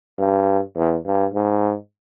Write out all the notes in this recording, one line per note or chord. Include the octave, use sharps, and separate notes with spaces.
G2
E2
G2
G#2